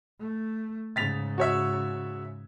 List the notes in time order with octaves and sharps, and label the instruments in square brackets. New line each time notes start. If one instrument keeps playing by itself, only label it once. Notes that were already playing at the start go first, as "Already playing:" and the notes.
[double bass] A3
[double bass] G#2 C#3 [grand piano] A6 B6 F7
[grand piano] F#4 C#5 E5